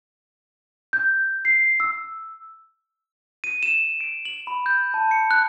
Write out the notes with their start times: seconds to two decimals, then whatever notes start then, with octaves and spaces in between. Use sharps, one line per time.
0.93 G6
1.45 C7
1.80 E6
3.44 D#7
3.63 E7
4.01 D7
4.25 F#7
4.47 B5
4.66 G6
4.94 A5
5.11 C#7
5.31 F#6